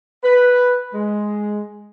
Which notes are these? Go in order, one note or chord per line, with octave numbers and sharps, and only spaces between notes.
B4
G#3